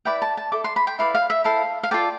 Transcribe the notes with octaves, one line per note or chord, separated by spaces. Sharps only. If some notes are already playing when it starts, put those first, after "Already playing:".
E4 B4 D5 G5
A5
A5
E4 A4 D6
C6
B5
G5
E4 B4 D5 F5
F5
E5
E4 A4 C5 F5
F5
F4 A4 D5 G5